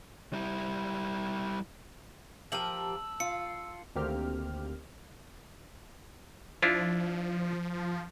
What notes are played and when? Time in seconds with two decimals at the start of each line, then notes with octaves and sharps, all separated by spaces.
0.33 G3 E4
2.52 F3 G4 A#4 A5 E6 F#7
3.20 F4 C#7
3.95 D2 D#3 A#3 C4 G4 F6
6.62 F3 D4 E4 F4